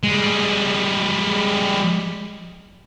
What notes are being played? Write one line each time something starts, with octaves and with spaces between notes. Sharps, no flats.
G3 G#3